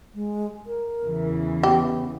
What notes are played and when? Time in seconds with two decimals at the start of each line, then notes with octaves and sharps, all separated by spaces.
0.14 G#3
0.66 A#4
1.03 E2 C#3 E3
1.63 B3 G4